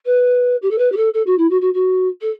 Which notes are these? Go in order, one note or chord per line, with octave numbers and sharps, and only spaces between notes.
B4
G4
A4
B4
G4
A4
A4
F#4
E4
F#4
F#4
F#4
A4